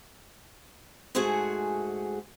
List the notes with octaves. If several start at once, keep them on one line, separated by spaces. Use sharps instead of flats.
G#2 G#3 A3 F#4 G#4 F#5